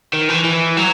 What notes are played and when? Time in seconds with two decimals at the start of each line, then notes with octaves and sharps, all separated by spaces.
0.13 D#3
0.29 E3
0.44 E3
0.77 F#3